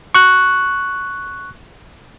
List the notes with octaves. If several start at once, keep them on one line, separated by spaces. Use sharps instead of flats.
C#6 F#6